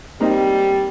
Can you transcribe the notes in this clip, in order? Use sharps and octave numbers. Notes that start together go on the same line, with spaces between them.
G3 A#3 C4 D#4